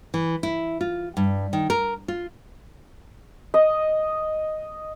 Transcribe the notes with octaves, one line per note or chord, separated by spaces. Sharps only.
E3
E4
F4
G2
D#3
A#4
F4
D#5